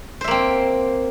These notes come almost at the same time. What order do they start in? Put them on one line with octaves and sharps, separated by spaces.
C5 E5 A#3 C4